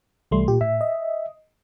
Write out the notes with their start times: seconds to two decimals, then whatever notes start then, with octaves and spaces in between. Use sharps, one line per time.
0.31 C2 E3 G3 A3 C6
0.48 A#2 G4
0.61 A2 E5
0.81 D#5